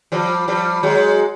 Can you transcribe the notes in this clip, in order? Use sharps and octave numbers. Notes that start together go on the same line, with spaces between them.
F3 G3
F3 G3
F#3 G#3